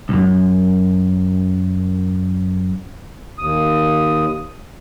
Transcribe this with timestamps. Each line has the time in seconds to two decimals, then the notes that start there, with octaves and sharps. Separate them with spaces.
0.09 C2 F#2
3.38 D#2 D#6